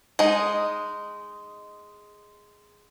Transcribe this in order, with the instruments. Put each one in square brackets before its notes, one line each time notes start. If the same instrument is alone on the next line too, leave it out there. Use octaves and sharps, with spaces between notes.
[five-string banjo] G#3 D#4